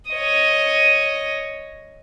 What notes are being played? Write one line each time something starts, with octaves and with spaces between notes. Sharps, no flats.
C#5 D#5